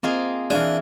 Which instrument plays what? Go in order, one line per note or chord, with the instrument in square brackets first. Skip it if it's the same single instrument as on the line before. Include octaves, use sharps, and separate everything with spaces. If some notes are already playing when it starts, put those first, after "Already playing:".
[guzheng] A#3 F4 G#4 [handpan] C4 D#5
[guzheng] E3 G#5 [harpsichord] D4 [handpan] G#4 E5 F5